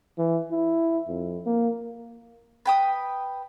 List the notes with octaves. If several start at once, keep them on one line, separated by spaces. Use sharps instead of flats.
E3
E4
F2
A#3
B4 G5 D#6